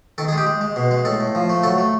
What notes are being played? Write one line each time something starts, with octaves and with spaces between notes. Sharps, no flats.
D#3 A4
G#4
G#3 G4
G#3
G#3
B2
G#3
A2 A4
A2
F3
A3
F#3 A4
A3